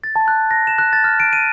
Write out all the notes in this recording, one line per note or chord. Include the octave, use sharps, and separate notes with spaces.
A6
A5
F#6
A#6
E7
F#6
A6
F6
D7
D#7